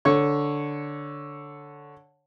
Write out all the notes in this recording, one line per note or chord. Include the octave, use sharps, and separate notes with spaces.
D3 C#5 C#6